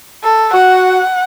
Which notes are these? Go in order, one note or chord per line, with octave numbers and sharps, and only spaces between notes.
A4
F#4 F#5